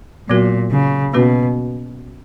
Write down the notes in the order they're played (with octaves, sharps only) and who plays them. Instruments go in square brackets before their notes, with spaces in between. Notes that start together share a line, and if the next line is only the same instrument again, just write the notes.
[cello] A#2 [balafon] F#3 B3 F#4 A#4
[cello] C#3
[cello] B2 [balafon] A#3 C#4 F#4 B4